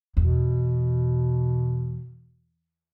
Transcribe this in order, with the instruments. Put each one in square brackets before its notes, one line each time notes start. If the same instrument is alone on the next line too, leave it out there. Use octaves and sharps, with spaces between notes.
[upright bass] E2 [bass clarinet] B2